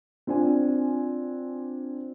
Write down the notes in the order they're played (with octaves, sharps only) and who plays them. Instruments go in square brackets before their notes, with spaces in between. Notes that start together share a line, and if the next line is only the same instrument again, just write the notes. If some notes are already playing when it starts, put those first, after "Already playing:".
[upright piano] C4 D4 F4 G#5